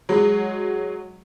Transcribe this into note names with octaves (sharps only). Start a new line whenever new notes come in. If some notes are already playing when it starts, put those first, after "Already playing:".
F#3 G#3